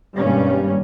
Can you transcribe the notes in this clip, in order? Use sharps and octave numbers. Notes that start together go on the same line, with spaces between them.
G#1 G2 B2 G3 A#3 C#4